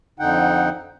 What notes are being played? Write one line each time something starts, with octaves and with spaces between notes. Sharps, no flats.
F2 D3 D#4 F#5 G5